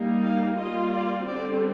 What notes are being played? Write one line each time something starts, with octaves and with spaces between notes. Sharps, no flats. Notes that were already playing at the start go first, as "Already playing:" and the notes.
Already playing: G3 A#3 D#4
F5
G3 A#3 F4 D#5
D5
D3 G3 C4 D5